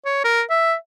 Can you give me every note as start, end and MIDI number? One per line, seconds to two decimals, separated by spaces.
0.06 0.23 73
0.24 0.42 70
0.50 0.75 76